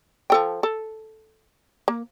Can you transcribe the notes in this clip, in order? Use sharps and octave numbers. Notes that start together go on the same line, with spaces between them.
F3 A4 G5
A4
A#3